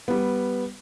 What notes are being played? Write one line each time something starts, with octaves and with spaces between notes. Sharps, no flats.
G3 B3